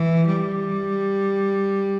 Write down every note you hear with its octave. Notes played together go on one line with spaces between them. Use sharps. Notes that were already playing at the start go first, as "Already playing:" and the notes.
Already playing: E3
G3